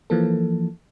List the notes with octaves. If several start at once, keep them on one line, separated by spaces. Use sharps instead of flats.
E3 F3 A#3 A4